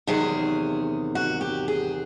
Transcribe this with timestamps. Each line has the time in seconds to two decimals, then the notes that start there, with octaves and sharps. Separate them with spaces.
0.07 E2 C3 D#3 F#3 G#4
1.15 F#4
1.41 G4
1.68 G#4